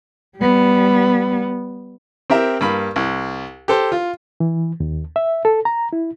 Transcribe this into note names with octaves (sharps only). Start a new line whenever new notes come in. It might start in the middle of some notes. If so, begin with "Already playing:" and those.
G3 B3
C4 G4 A#4 E5
G2 A#3 B5
C2
G4 A4 C5
F4
E3
D#2
E5
A4
A#5
E4